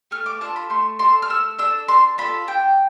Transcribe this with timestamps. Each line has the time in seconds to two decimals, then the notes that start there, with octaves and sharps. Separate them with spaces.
0.11 A3 F6
0.26 D6
0.41 D4 F4 A4 A5
0.56 B5
0.70 A3 C6
0.99 D4 A4 C6
1.22 F6
1.29 A3 E6
1.58 D4 A4 E6
1.88 D4 C6
2.18 F4 A4 B5
2.47 D4 G5